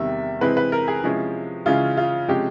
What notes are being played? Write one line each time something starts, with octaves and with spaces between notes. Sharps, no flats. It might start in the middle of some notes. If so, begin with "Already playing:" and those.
Already playing: E2 C3 D#3 G3 E5
C3 E3 G#3 C4 E4 B4
B4
A#4
G#4
C3 F3 G#3 C#4 E4
C#3 E3 G#3 C#4 E4 F4
F4
C3 F3 G#3 C#4 G4